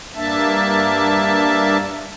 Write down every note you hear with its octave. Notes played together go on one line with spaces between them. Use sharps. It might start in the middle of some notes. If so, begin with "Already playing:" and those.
G2 A#3 D4 E5 A5